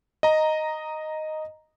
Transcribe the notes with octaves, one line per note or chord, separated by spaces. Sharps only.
D#5 A#5